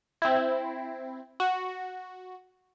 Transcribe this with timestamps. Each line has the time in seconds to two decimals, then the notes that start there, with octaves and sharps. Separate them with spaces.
0.22 C4 E4
1.40 F#4